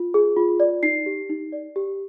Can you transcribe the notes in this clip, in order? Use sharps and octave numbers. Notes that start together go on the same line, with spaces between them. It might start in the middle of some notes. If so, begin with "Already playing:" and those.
Already playing: F4
G#4
F4
D5
D#4 C7
G4
D#4
D5
G4